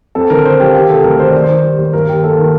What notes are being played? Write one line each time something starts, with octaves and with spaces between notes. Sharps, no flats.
F2 A4
D3 A#4
D3 C5
F3 G4
D#3 G4
C3 A4
D2 A#4
D#3 C5
D#3 D5
C5
D#3
G3
D#2
G2 A#4
D#3 G4
A#3 A4
D#3 A#4